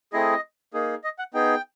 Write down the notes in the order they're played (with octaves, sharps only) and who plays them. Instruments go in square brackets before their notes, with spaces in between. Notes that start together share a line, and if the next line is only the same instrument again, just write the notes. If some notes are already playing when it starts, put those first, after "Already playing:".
[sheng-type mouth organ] A3 C4 E4 G#4 D#5
A#3 D#4 G#4
D#5
F#5
B3 D#4 G#4 G5